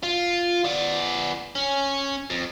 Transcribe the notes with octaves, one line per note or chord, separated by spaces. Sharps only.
F4
B3 D5
C#4
F2